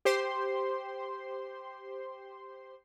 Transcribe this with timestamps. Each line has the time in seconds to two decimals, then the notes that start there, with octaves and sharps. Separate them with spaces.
0.05 G4 C5 C6